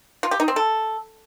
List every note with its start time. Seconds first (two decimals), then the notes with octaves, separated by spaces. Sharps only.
0.23 F4
0.31 G4
0.40 D#4
0.48 C4
0.56 A4